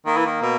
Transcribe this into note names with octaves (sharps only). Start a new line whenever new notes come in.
D#3 A#3
E3
D#3
B2